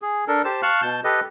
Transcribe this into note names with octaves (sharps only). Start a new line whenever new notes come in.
G#4
D4 A4 A#4
G4 C5 A5
F5 A5 C#6 F6 F#6
B2 A5 G6
G4 A4 B4 D#5